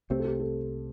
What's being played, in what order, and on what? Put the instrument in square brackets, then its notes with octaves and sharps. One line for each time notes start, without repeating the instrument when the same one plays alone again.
[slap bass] C2 C3 A3 C4 [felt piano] G4 C5
[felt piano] A4
G4
A4